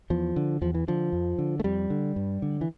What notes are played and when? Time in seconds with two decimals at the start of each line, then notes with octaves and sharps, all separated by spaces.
0.10 E2 F3
0.36 D3
0.61 E2 F3
0.75 E3
0.88 D3 F3
1.12 F2
1.39 D3
1.60 A3
1.64 F2 G3
1.90 D3
2.16 G2
2.42 D3
2.61 E3